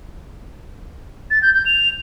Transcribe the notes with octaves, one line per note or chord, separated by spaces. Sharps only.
A6
G6
G6
F7